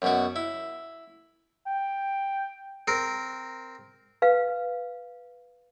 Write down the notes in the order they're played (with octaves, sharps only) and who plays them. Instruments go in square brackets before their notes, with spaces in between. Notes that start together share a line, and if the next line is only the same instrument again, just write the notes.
[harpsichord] F#2 B2 F#4
E4
[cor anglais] G5
[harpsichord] C4 A#4
[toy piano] B4 F5